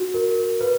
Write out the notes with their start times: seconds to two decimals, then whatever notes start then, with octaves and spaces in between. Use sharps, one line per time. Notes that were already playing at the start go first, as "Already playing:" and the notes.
Already playing: F#4
0.14 A#4
0.61 B4